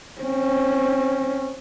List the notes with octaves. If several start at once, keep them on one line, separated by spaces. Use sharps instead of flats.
C4 C#4